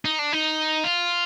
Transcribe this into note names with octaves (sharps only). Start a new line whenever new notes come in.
D#4
D4
D#4
F4